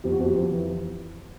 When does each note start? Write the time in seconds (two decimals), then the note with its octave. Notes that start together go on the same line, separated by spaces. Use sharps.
0.04 F2 G4
0.12 F#4
0.20 F2 G4
0.36 F2
0.52 E3